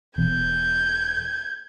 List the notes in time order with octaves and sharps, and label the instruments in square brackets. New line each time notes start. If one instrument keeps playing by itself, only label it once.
[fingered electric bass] E1 E2 [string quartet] G6 G#6